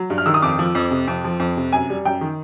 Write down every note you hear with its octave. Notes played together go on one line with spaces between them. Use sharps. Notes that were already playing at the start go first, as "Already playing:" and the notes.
Already playing: F#3
G2
F6
D#3 E6
D#6
F2 D6
F3
F2
C3
F2
F3
F2
C3
F#2 G#5
G3
F#2 G5
D#3